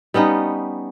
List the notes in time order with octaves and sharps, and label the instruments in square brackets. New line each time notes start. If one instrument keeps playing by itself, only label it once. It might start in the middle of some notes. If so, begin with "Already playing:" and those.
[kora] G3 B3 C#4 D#4